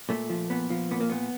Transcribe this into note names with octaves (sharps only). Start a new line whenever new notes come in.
A#2 A3
F3
A#2 B3
F3
A#2 B3
A#3
A#2 B3